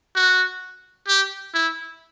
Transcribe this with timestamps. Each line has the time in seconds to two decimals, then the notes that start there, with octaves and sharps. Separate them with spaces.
0.16 F#4
1.08 G4
1.54 E4